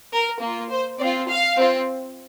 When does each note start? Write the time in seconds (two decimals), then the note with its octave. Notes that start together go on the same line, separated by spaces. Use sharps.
0.12 A#4
0.41 A#3 F4
0.70 C5
0.99 C4 D5
1.03 F4
1.28 F5
1.57 C4 F4